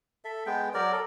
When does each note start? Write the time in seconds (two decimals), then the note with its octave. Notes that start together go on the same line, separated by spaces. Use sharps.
0.25 A4 E5
0.46 G#3 B3 G5
0.74 F#3 A#4 D5
0.92 A4